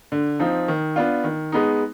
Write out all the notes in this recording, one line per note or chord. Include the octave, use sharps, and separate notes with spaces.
D3
F3 C4 D#4
D#3
B3 D4 F4
D#3
G#3 B3 D#4